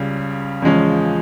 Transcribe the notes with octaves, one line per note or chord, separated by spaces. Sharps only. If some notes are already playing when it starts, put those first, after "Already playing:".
Already playing: C#2 C#3 G3
E2 C#3 F3 G#3 C#4